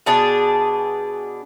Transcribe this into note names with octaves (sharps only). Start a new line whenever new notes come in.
B2 D4 G#4